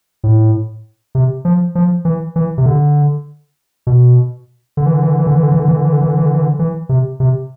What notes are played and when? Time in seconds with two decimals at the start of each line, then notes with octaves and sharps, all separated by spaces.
0.24 A2
1.15 C3
1.45 F3
1.75 F3
2.05 E3
2.36 E3
2.58 C3
2.66 D3
3.87 B2
4.77 D3
4.86 E3
4.94 D3
5.02 E3
5.10 D3
5.19 E3
5.27 D3
5.35 E3
5.43 D3
5.52 E3
5.60 D3
5.68 E3
5.77 D3
5.84 E3
5.93 D3
6.01 E3
6.08 D3
6.17 E3
6.26 D3
6.34 E3
6.42 D3
6.59 E3
6.89 C3
7.20 C3